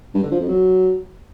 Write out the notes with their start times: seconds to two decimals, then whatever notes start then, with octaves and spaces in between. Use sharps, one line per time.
0.14 G2
0.23 D3
0.31 F3
0.40 F2
0.48 F#3